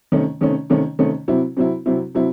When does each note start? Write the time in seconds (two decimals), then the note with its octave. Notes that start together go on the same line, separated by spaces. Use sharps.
0.12 C3 D#3 A3 C#4
0.41 C3 D#3 A3 C#4
0.70 C3 D#3 A3 C#4
0.99 C3 D#3 A3 C#4
1.28 C3 F#3 C4 E4
1.57 C3 F#3 C4 E4
1.86 C3 F#3 C4 E4
2.15 C3 F#3 C4 E4